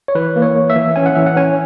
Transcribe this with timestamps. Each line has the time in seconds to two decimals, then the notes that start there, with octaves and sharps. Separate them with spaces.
0.08 C#5
0.15 E3 B4
0.36 A#3
0.42 C#5
0.55 A#3
0.70 E5
0.76 E3
0.96 C#4 G#5
1.06 F#5
1.15 E3 E5
1.26 F#5
1.37 C#4 G#5